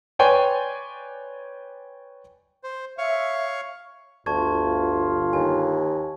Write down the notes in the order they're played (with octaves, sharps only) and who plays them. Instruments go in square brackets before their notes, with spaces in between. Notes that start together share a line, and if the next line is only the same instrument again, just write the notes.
[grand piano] B4 C#5 D5 G5 G#5 C6
[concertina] C5
[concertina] C#5 F5 C#6 [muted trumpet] E5
[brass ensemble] G1 F4 [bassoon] D2 [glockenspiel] A5 C#6 G#6
[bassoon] D#2 [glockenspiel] G#5